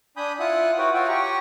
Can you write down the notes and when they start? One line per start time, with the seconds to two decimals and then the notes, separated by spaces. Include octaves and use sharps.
0.17 D4 G#5 B5 D#6 G6
0.40 E4 F4 E5 F#5 D#6 F#6
0.78 E4 F#4 B4 C#5 F#5 G5
0.94 F4 F#4 C#5 E5 F#5 G5
1.08 G4 G5 G#5 A#5 C#6